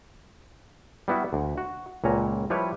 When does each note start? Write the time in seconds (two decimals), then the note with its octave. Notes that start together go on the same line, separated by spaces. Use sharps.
1.08 G3 B3 E4 F#4
1.33 D2
1.58 F#4
2.04 C#2 A#2 C#4 A#5
2.50 F3 G3 E4 G4 B4 C#5